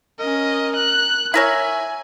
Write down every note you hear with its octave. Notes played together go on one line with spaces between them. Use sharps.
C#4 A#4 D#5
F#6
E4 A#4 C#5 E5 G#5